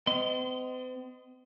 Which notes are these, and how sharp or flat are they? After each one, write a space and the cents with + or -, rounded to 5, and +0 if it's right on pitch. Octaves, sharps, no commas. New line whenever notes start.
C4 -45 D#5 +0 C6 -25